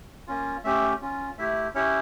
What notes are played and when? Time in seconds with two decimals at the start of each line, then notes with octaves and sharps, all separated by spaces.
0.28 A#3 C#4 F4
0.64 A3 C#4 G4 E5
1.02 C#4 F4
1.38 A3 E4 G4 E5
1.75 C#4 E4 G4 C#5